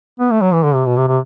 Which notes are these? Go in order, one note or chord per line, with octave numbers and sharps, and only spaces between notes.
B3
A3
F#3
E3
D3
C3
B2
C3
C3